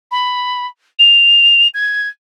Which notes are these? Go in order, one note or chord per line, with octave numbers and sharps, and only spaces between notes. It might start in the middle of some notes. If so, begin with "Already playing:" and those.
B5
F7
G#6